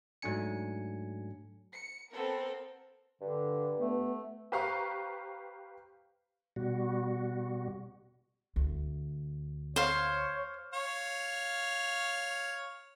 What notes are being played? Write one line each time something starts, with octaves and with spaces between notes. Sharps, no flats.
G#2 F#3 A3 D4 G#5 C#7
C#7
B3 C4 A4 A#4
G2 D3
A3 B3
G4 B4 C5 F5 A#5 C#6
B2 G3 F#4
D2
C5 C#5 F5
C#5 F5